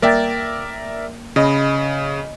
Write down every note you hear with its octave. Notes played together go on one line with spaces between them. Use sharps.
A#3 A#4 D5 E5 G5 A6
C#3 D#5 B5